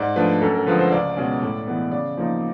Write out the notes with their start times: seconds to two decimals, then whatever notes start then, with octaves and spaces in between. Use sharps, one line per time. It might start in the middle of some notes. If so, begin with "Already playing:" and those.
Already playing: G#2 D5
0.16 F3 A3 D4 B4
0.41 F#2 A4
0.54 A#4
0.66 D3 F3 G#3 B4
0.79 C5
0.92 C#2 D5
1.17 B2 G#3 C#4
1.42 A2
1.67 E3 G#3 B3
1.92 C#3 D5
2.17 F3 A#3 D#4